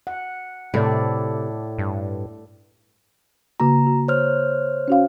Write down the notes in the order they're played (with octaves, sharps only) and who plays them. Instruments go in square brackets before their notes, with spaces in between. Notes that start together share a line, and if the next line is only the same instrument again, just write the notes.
[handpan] F#5
[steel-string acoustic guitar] A2 [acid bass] C3 [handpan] A3 A4 D5
[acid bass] G2
[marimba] C#3 A#3 F#4 [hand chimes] A#5
[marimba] F#4
[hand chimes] C5 C#5 F6
[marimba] C#4 F#4 F5